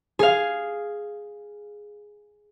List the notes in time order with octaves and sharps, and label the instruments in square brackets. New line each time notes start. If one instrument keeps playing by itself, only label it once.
[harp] G#4 F5